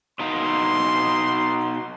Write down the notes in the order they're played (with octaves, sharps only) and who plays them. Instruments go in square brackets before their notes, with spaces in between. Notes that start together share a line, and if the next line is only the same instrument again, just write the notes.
[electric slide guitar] B2 D#4 F5 [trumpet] C6